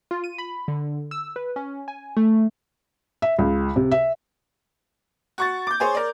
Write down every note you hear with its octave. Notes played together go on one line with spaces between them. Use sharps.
F4
D#7
B5
D3
E6
B4
C#4
G#5
A3
E5
C#2
C3
E5
F#4 C#6 A6
D6 G6
G#4 C5 C#5
A#4 D5